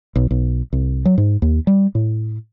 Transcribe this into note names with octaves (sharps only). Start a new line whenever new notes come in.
B1
B1
C2
F#3
G#2
D#2
G3
A2